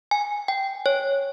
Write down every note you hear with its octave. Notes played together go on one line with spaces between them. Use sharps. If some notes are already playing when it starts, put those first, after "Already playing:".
G#5
G5
C#5